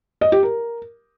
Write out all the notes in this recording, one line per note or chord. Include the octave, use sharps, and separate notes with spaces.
D#5
G4
A#4